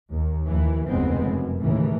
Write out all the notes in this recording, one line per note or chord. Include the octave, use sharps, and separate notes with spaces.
D#2
D#2 E3
F1 D#2 C#3 G#3 B3 C4
F#2
D#2 A2 C#3 E3